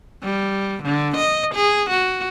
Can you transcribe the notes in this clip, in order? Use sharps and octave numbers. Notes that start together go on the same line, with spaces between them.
G3
D3
D#5
G#4
F#4